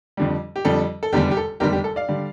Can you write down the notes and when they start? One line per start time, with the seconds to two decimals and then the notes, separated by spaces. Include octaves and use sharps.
0.17 F2 D3 G3
0.56 G4
0.65 F2 D3 G3 A4
1.03 A4
1.13 F1 E2 D3 G3 G4
1.31 G4
1.37 A4
1.60 F1 E2 D3 G3 G4 A#4
1.73 G4
1.84 A4
1.96 D5 F5
2.09 D3 G3